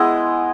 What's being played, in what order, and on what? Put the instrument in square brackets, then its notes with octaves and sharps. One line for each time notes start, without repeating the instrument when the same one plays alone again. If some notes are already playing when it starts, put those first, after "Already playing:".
Already playing: [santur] G#3 B3 E4 D#5